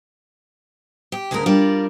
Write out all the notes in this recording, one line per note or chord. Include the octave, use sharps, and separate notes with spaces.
G4
D2 C#3 G#3 A3 A#4
G3 D4 F4 A#4 D5